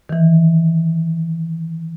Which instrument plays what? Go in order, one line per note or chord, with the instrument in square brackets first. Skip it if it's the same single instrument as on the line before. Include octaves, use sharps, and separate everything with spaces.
[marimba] D#3 E3